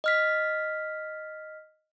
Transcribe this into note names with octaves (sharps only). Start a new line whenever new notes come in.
D#5 F6 B6